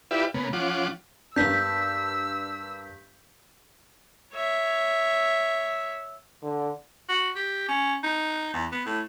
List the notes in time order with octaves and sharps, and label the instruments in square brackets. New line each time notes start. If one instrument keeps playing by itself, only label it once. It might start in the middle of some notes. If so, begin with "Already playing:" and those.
[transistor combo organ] E4 F4 G4 B4 D5 E5
C#3 A#3 B3
F3 C#4 F4 F#5 D6
[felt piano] G2 A#3 B3 [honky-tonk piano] D4 [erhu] E6 [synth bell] G6 B6
[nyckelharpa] C#5 E5
[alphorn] D3
[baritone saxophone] F#4
G4
C#4
D#4
E2
B3
A2